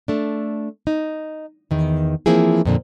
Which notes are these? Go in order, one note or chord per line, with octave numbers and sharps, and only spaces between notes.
A3 D4
D#4
E2 D#3
E3 F3 A#3 C4 E4 G#4
F2 A#2 D3